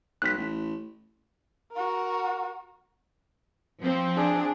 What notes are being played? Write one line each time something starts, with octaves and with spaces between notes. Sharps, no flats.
B1 F#6 B6
A1
F#4 A#4
F3 C4
D4 G#4